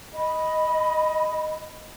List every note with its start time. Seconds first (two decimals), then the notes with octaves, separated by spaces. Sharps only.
0.13 D#5 B5